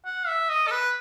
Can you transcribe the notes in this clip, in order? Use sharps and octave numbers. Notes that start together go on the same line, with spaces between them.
F#5
E5
D#5
A4
B4